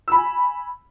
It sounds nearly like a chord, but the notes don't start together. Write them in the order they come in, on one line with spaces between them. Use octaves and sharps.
E6 B5 G#5